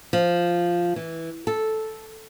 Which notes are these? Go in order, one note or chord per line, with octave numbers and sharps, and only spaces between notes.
F3
E3
A4